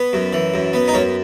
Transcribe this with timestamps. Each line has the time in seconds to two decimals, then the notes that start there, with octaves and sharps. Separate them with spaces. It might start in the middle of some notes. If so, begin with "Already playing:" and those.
Already playing: B3
0.13 F#2
0.33 E3
0.54 F#2
0.73 B3
0.88 D#4
0.94 F#2 C#4